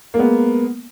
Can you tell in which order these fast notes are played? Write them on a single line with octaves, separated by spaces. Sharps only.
A#3 G#3 B3